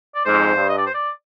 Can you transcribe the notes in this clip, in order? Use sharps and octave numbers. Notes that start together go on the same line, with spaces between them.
D5
F2 G#2 C5
G2
D#5
D5
C5
D5